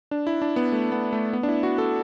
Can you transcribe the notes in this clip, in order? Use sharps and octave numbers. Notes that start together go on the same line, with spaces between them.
D4
E4
D4
B3
A3
B3
A3
B3
D4
E4
F#4
A4